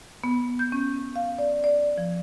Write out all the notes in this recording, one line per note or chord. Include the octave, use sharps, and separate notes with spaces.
B3
G6
C#4
F5
D5
D5
F3